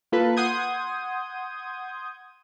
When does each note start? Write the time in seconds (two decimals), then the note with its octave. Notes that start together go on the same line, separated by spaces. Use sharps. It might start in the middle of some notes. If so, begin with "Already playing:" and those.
0.12 A#3 F4 A4 B4
0.37 F#5 C6 D#6 G6 G#6